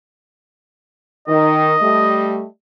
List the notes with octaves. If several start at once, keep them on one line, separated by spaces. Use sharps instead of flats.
D#3 D#5
G3 A3